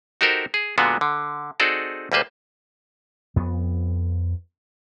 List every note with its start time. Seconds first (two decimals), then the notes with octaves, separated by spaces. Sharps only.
0.21 D#4 F#4 G4 A4 A#4 C5
0.54 G#4
0.78 A#2 D3 G#3 B3 F4 F#4
1.01 D3
1.60 C4 D#4 F#4 G#4 A4 D5
2.12 D2 G3 A#3 B4 C5
3.36 F2 B3